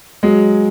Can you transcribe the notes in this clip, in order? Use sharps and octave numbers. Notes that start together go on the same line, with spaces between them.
F#3 G#3